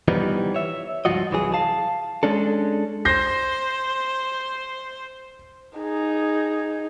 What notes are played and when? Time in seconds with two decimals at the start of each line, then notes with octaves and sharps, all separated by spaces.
0.08 E3 F3 G3 B3 D#4
0.54 C#5 E5
1.05 C#2 G2 F3 F4 F#4 D#5
1.31 C2 E3 F#3 G#4
1.54 F5 A5
2.23 G#3 C#4 D4 A4
3.05 C5 G6 A#6 C7
5.78 D#4 G#4